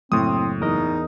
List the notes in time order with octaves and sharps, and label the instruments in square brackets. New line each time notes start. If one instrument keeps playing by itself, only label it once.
[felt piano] F#1 [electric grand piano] A2 D#6 [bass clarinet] C4
[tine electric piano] E2 A#4 D#5 [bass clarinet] D#4